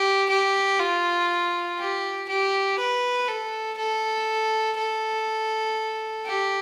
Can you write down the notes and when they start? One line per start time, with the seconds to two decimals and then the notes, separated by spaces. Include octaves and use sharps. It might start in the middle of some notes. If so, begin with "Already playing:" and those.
Already playing: G4
0.29 G4
0.79 F4
1.79 G4
2.28 G4
2.78 B4
3.28 A4
3.77 A4
4.78 A4
6.26 G4